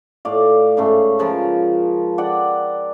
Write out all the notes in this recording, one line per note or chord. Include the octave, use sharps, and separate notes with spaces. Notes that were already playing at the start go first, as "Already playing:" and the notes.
A2 D5 F5
G#2 C#3 A3
C#3 F3 A#4 B4
D5 F#5 G5